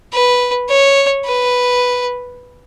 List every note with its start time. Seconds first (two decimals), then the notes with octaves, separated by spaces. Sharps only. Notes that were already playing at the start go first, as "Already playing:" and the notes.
0.13 B4
0.68 C#5
1.25 B4